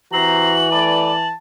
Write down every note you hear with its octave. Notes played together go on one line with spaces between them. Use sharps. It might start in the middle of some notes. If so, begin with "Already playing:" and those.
C3 E3 C4 F#4 A#5 F#7
A3 B4 D5 A5